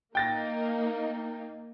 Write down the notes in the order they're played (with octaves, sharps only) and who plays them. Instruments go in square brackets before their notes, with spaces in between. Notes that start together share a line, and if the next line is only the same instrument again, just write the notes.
[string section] A#3 D#4 [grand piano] G5 A6 A#6